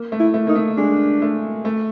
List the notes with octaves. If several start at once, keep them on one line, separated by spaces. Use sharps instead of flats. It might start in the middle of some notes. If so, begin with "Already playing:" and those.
Already playing: A#3
A3
E4
A3
A#3 D#4
A3
G#3 D4
A3
A3